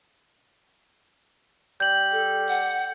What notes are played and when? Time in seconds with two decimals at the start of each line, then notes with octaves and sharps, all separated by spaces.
1.80 G3 G6 F#7
2.12 A4
2.49 F#5